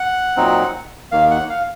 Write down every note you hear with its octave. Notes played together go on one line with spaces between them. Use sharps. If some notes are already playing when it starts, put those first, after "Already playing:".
Already playing: F#5
A#2 F#3 C4 D#4
D#2 D#3 A#3 F5
F#5
F5